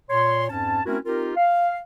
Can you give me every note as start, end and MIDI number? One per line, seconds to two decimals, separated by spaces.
0.10 0.48 46
0.10 0.48 73
0.10 0.48 84
0.50 0.81 41
0.50 0.81 44
0.50 0.81 61
0.50 0.81 81
0.86 0.98 57
0.86 0.98 60
0.86 0.98 61
0.86 0.98 64
0.86 0.98 66
0.86 0.98 70
1.06 1.32 60
1.06 1.32 63
1.06 1.32 65
1.06 1.32 67
1.06 1.32 70
1.37 1.77 77